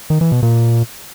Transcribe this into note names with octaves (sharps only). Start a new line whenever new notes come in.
D#3
E3
B2
A#2